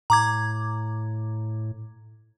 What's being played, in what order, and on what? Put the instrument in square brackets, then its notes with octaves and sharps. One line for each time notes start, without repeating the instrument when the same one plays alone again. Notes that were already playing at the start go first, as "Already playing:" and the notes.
[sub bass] A2 [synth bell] A#5 D6 G#6